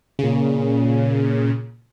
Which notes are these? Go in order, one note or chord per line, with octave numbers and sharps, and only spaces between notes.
A#2 C#3